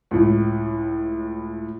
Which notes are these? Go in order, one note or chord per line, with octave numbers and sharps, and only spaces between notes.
C#2 A2